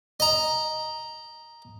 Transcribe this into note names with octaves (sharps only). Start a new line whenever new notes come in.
D#5 A#5